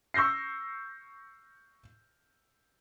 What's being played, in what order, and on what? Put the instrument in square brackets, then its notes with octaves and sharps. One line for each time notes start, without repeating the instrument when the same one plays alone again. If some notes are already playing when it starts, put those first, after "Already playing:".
[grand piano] C#6 E6 G6 A#6 C7